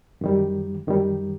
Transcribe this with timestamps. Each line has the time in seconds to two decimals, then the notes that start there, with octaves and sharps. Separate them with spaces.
0.21 F#2 D#3 G3
0.87 F#2 D#3 G3